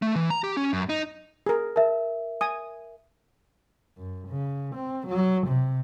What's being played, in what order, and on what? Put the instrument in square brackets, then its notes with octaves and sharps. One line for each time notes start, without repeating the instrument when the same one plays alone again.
[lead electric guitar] A3
E3
A#5
G4
C#4
F#2
D#4
[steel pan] G#4 A#4
[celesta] A#4 E5 [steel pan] A5
[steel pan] G#5 D#6
[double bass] F#2
C#3
C4
F#3
C3